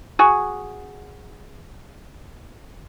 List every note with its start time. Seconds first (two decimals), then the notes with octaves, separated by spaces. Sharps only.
0.19 F#4 G#4